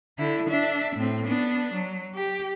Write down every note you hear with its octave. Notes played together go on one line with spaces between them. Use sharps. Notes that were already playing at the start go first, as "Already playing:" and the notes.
D3 E4
D4 E5
A2 C4
B3 D4
F#3
G4